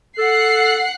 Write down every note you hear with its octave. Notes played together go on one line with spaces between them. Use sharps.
A4 F#5 F#6 C7